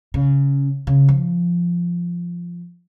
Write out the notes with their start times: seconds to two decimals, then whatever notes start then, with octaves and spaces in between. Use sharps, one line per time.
0.14 C#3
0.87 C#3
1.09 F3